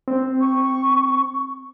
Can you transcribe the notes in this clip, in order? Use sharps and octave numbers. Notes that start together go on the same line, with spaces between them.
C4
C#6